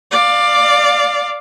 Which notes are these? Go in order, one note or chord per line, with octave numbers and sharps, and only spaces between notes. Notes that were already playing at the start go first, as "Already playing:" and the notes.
D5 F5